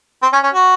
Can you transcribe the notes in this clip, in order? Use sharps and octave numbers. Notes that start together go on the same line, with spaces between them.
C4
C#4
C#4
F#4